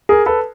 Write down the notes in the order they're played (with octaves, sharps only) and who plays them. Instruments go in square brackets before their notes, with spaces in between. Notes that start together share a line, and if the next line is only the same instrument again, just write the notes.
[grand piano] G#4 A#4
A4 B4